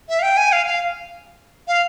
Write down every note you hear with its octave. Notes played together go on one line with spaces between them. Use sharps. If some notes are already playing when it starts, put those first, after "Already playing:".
E5
F5
G5
G#5
F5
F5
F5